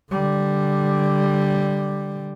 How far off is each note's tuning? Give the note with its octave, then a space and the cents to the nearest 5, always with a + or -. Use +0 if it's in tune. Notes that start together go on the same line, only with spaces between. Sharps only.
D3 +0 G3 +0